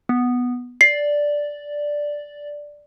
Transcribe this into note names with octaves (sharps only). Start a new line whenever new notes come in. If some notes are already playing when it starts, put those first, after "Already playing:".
B3
D5 C7